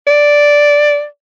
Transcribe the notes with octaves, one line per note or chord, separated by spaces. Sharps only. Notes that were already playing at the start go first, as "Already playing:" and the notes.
D5